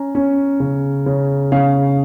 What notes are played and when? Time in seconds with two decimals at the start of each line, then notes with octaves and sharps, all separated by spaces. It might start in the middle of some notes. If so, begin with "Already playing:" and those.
Already playing: C#4 A#5
0.15 C#4
0.60 C#3
1.06 C#3
1.52 C#3 F5